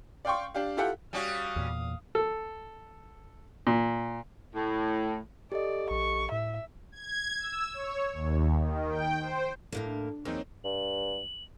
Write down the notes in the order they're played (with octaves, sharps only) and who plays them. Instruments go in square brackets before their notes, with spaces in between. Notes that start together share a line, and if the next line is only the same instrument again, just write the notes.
[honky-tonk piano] D5 F5 G5 C6 C#6
D4 G4 F5
E4 F4 G4 A4 E5 F#5
[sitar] G3 C#4 F#4 [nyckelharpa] F5 D#6
[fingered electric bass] E2 A#2
[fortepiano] A4
A#2
[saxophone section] A2
[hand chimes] G4 A4 D#5 [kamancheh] D5
[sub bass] A#1 [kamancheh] C#6
[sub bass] A2 [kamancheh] E5
[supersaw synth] G#6
E6
C#5
D#2
D#3
G5
C5
[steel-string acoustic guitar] D2 A2 A#3 [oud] D4
[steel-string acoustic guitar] E2 [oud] F#3 [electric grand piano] A#3 C4 D#4
[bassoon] G2 [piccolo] F#7